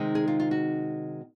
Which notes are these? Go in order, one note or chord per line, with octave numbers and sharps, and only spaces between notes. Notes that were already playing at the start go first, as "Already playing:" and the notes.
Already playing: C3 D#3 G#3 C4 D#4
G#4
F4
F4
F#4